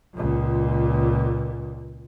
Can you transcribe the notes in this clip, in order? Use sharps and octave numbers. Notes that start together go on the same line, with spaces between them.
C#2 A#2